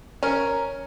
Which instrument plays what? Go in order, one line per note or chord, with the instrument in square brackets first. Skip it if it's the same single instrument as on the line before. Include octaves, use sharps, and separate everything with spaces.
[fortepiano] C#4 [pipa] A#4